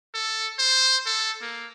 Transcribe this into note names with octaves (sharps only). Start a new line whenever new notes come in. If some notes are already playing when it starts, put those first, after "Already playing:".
A4
C5
A4
A#3